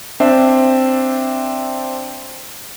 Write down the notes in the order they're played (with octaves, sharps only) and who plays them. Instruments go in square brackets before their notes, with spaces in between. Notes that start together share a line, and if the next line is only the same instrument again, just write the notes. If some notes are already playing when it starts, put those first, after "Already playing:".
[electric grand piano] C4 D4 C5 D5 E5